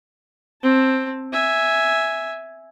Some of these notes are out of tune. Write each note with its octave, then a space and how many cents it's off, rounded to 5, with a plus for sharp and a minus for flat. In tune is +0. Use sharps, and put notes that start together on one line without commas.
C4 +10 A5 +0
E5 +0 G#5 +0